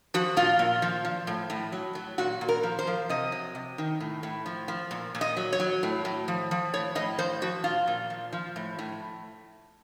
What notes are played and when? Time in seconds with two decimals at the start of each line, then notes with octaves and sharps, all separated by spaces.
0.14 F3 F#4
0.37 A#2 F4
0.59 A#2
0.82 F3
1.05 F3
1.27 A2
1.50 A2
1.72 F#3
1.95 F#3
2.18 A#2 F#4
2.41 A#2
2.49 A#4
2.63 F3
2.79 C5
2.87 F3
3.09 C3 D#5
3.32 F#3
3.55 C3
3.78 D#3
4.00 A2
4.23 A2
4.46 F3
4.68 F3
4.91 A#2
5.15 A#2
5.21 D#5
5.37 F#3
5.53 C#5
5.60 F#3
5.83 A2
6.05 A2
6.28 F3
6.51 F3
6.74 A2 C#5
6.95 A2 D#5
7.18 F3 C5
7.42 F3 F#4
7.64 A#2 F4
7.87 A#2
8.10 F3
8.32 F3
8.56 A2
8.79 A2